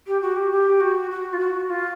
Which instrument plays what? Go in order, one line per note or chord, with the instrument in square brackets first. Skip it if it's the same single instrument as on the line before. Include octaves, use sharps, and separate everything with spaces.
[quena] G4
F#4
G4
G4
F#4
F#4
F4
F#4
F4